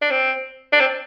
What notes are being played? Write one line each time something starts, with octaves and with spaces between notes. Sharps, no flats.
D4
C4
D4
C4